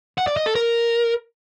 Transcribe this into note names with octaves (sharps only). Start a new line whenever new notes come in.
F#5
D5
D#5
A4
A#4